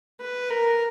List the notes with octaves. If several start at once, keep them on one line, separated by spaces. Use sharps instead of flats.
B4
A#4